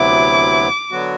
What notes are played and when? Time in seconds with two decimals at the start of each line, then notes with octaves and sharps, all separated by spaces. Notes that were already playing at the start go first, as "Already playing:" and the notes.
Already playing: D2 C3 F#3 B3 E4 D6
0.92 D3 F#3 B3 F#4